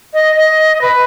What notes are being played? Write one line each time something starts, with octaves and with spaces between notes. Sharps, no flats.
D#5
D#5
B4